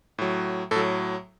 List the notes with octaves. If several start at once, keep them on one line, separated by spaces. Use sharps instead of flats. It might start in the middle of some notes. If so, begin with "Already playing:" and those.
A2 F#3
A2 F#3 A4